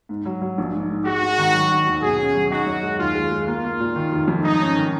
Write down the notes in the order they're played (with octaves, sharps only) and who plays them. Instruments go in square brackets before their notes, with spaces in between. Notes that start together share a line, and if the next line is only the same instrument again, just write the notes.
[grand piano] G#2
F#3
F#3
A#1
G#2
G#2
[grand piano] G#3 [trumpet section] F#4
[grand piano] G#3
D#3
F#3
F#3
D#2
[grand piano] B2 [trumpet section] G#4
[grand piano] C#4
F#3
[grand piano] D#4 [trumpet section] F#4
[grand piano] F#2
G#3
[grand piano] D#2 [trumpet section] F4
[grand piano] G#3
G#3
[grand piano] A#3 [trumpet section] F4
[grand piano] A#3
A#2
D#3
F1
F2
[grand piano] G#2 [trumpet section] D#4
[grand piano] C#4
D#3